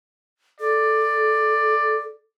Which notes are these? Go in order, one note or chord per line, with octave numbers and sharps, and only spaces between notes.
A4 D5